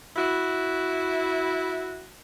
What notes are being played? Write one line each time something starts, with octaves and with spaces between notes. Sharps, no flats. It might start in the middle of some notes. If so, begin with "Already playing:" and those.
E4 F#4